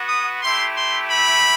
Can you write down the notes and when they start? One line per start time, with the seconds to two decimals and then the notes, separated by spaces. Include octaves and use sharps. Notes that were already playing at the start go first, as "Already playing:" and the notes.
Already playing: B3 F#4
0.08 D#6
0.42 A3 E4 G4 C6
0.76 C6
1.10 B5